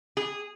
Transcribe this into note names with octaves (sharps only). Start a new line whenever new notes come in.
G#4